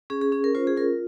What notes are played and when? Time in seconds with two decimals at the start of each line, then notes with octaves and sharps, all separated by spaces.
0.10 C#4 G#4
0.21 G#4
0.32 C#4 G#4
0.44 A#4
0.55 F4 C5
0.67 G#4
0.77 F4 A#4